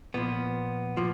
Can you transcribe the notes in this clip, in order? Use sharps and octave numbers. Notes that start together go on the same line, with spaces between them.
A#2 F3 B3
A#2 F3